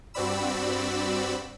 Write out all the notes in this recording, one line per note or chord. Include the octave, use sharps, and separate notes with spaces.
G2 C4 F#4 D5 B5 E6